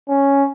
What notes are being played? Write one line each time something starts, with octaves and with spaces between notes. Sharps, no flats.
C#4